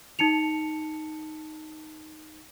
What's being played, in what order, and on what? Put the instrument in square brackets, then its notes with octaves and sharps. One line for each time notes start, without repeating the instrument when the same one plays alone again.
[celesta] D#4 A5 C#7 F7